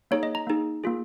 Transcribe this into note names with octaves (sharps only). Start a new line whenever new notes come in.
A#3 D#4 G#4 C#5
D#5
A#5
A#3 D#4 G#4
A#3 F4 G#4